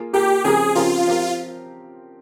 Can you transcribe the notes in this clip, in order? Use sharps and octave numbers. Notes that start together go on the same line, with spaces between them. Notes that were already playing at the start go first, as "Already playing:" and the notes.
Already playing: A#3 F4 G#4
A#3 F4 G4 G#4
C#3 F3 C4 G4 G#4 A#4
C#3 F3 C4 F4 G4 A#4
F3 C4 G4 A#4